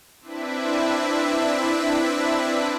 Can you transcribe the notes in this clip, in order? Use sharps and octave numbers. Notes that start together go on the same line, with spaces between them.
C4 D4 E4 B4 E5